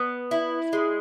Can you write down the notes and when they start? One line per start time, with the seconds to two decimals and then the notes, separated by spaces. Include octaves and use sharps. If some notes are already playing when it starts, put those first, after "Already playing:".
Already playing: B3
0.31 E4
0.73 G#3